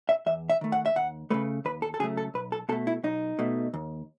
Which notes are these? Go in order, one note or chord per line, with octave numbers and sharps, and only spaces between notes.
E5
E2 E5
E5
D#3 A3
F#5
E5
D#2 F#5
C#3 F#3 A3 B4
D#2 B4
A4
A4
C#3 F#3 A3 G#4
A4
B1 B4
A4
B2 A3 A4
E4
B1 D#4
B2 A3
D#2